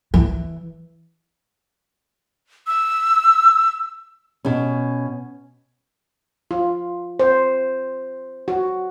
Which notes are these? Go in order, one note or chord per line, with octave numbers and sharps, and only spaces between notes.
E3
E6
B2 C#4
F4
C5
F#4